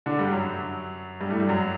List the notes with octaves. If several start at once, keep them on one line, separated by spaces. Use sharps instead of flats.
D3 D4
G2 G3
F#2 F#3
G2 G3
A2 A3
G2 G3
F#2 F#3